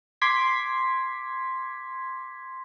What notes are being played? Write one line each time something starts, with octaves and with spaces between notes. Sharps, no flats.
C6 D6 G#6 B6